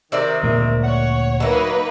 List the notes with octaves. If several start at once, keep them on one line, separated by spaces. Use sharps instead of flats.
C3 D#3 A#4 D5 E5
D2 A#2 G#3
C#5 F#5
F#3 A#3 D#4 B4 E5